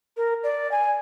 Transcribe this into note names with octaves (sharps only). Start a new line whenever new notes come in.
A#4
D5
G#5